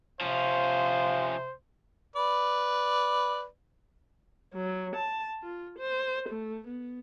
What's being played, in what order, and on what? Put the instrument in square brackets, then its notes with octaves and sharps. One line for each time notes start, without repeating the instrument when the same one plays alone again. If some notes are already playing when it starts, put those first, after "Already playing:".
[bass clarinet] C3 [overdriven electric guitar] F3 C#4 [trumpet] C5 [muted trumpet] F5
[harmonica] B4 D5
[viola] F#3
A5
F4
C5
A3
B3